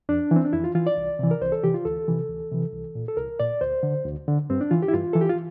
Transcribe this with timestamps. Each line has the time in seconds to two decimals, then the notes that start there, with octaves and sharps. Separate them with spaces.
0.09 F2 D4
0.31 E3 C4
0.45 D4
0.53 F2 E4
0.64 F4
0.75 E3 F4
0.87 D5
0.97 C2
1.19 C3 E3
1.31 A#4
1.41 C2 C5
1.52 A4
1.63 C3 E3 G4
1.74 F4
1.85 D2 A4
2.08 C3 E3
2.29 D2
2.51 C3 E3
2.73 C2
2.95 A#2
3.08 A4
3.17 C2 A#4
3.39 A#2 D5
3.61 D2 C5
3.83 D3
4.05 D2
4.28 D3
4.50 G2 C4
4.61 D4
4.71 E3 F4
4.82 G4
4.88 E4
4.93 G2 F4
5.13 E3 A4
5.21 G4
5.29 F4